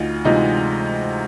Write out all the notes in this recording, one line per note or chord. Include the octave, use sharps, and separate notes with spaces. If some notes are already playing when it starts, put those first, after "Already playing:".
Already playing: D2 D#4 F4
C3 E3 G#3 D#4 F4